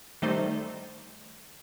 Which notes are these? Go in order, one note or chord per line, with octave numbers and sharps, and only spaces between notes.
D#3 G3 A3 D#4 C5